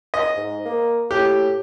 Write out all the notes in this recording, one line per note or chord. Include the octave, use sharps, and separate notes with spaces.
D#5
G#2
A#3
A2 G4